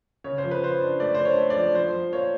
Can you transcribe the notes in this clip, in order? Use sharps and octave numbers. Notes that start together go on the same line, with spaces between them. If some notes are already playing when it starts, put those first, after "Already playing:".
C#3 C#5
C5
F3
B4
F3 C5
D4
A3 D5
D4 C5
C#5
A3
D5
F3
F3 C5
F3
A#3 C#5